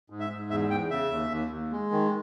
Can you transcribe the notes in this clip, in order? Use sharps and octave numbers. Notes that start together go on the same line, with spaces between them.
G#2
E5
G#2
E2 E5
E2 G5
C#3 E5
D#2
D#2
D#2
G#3
D#3